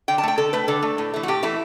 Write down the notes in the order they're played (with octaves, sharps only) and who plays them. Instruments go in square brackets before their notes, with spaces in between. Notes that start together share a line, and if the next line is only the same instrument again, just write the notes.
[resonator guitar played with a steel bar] D3 G5
A5
A3 G5
D3 A4
A3 B4
D3 A4
A3
A2
E3 A3
F#4
A2 G4
E3 A3 E4